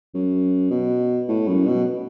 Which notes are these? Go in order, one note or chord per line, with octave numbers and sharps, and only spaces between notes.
F#2
B2
A2
F#2
B2